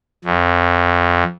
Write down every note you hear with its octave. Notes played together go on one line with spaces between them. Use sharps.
F2